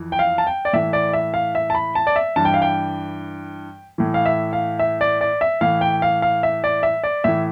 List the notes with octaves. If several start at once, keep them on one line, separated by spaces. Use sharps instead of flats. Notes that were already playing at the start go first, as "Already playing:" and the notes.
Already playing: F2 E3
G5
F5
A5
G5
D5
A2 E3 E5
D5
E5
F5
E5
A5
B5
A5
D5
E5
G2 E3 A5
G5
F5
G5
A2 E3
F5
E5
F5
E5
D5
D5
E5
A2 E3 F5
G5
F5
F5
E5
D5
E5
D5
A2 E3 E5